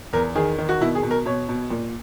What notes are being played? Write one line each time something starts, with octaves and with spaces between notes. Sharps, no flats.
E2 A#4
D#3 G#4
D#3
F#4
B2 E4
G#4
B2
A#4
B2 C#5
B2
A#2